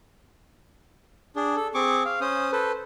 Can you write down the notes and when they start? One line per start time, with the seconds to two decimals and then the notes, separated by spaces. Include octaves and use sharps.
1.36 D4 G#4
1.56 A4
1.74 C4 G#4 C#6 D6
2.05 F5
2.21 C#4 C5 D#6
2.52 A4 B4 C5